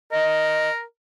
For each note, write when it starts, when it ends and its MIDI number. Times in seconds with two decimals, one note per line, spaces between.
0.12 0.82 70
0.12 0.69 75